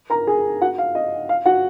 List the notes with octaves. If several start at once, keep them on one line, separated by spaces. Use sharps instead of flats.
A#4 A#5
G#4 G#5
F#4 F#5
F5
D#5
F5
F#4 F#5